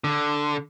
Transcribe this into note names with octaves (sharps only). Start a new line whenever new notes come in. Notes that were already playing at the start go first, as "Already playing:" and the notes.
D3